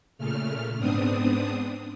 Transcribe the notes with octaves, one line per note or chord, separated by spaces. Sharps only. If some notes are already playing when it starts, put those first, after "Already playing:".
A#2 C#3 A3 F6
G#2 B3 C4 D4 D#6